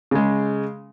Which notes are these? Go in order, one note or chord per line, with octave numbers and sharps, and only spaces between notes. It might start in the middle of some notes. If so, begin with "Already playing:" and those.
C#3 G#3